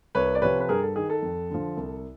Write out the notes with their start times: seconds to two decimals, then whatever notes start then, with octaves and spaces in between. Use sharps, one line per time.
0.15 C2 B4 C#5
0.35 D5
0.42 C3 F3 B4 C#5
0.60 B4
0.69 G2 G#4 A#4
0.82 A4
0.95 D#3 G#4
1.10 A4
1.23 F2
1.50 D3 F3
1.77 C2